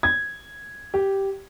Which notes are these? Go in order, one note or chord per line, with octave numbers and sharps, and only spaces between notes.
G#6
G4